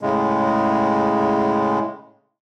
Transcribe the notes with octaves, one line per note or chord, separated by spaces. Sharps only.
A2 C#3 G#3